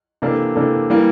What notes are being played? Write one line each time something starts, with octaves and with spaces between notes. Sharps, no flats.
C3 E3 A#3 D4 A4
C3 E3 A#3 D4 A4
E3 G3 A#3 E4